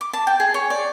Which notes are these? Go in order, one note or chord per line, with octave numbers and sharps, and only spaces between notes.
D6
A5
G5
G#4
C#5
D5